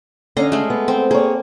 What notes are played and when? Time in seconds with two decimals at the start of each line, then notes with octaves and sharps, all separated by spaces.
0.37 D3 C#4 D#5 F5 A#5
0.52 G#3 A3
0.70 B3
0.88 C4
1.11 A#3 G#4 C#5